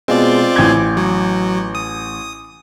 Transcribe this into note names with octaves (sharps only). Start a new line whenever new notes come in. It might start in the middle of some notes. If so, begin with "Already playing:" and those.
B2 G#3 C4 F4 D5
A1 G#5 D6 G#6
F#3
D#6